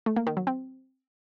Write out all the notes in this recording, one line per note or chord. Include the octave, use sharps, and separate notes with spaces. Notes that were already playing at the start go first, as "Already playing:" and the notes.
A3
A#3
D#3
F#3
C4